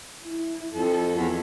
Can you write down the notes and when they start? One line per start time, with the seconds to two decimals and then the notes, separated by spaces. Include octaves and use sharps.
0.23 E4
0.75 F2 A4
1.16 E2